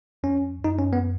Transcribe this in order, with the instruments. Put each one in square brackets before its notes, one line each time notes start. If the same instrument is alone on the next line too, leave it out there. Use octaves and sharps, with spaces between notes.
[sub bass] F2 [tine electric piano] C#4
[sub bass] F#2 [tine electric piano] D#4
[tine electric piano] C#4
B3